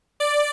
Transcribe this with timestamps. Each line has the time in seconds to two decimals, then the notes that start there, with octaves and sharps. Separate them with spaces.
0.20 D5